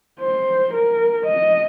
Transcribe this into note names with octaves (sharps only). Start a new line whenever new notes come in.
C5
A#4
D#5